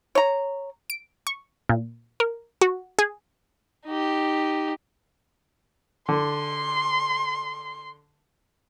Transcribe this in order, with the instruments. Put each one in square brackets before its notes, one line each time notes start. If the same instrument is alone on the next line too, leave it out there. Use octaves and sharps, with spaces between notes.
[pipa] C#5 A#5
[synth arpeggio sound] D7
C#6
A#2
A#4
F#4
G#4
[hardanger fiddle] D#4 G4
[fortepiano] D3 [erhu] C6